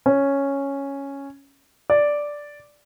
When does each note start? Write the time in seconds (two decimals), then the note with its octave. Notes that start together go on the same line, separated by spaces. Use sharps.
0.06 C#4
1.90 D5